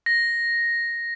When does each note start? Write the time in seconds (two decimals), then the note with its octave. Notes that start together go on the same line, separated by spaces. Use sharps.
0.06 A#6